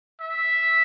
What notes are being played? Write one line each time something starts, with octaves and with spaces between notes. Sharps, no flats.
E5